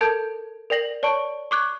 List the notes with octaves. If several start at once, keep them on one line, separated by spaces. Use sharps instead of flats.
A4 A#4 A5 G6 G#6
A#4 D5 G5 A#6 F#7
C#5 D5 A5 C#6 D7
C#6 D6 F#6 G#6